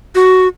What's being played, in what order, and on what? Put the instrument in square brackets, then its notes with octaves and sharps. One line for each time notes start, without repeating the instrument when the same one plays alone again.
[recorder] F#4